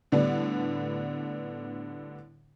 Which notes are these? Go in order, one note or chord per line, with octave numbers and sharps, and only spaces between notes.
A2 D3 G3 B3 D4